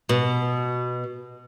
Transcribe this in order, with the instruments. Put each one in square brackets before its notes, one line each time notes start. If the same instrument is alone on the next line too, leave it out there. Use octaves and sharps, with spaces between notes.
[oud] B2